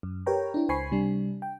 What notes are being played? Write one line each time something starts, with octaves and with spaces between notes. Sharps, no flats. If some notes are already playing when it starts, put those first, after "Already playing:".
F#2
G4 A#4 B4 C#5 G5 A#5
D4 E4
C#2 C5 G#5 B5 C#6 C7
C3 G3 D4
G5